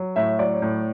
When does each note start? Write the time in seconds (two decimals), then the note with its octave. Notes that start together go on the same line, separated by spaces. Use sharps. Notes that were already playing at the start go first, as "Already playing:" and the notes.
Already playing: F#3
0.16 A2 E5
0.39 F#3 D5
0.62 A2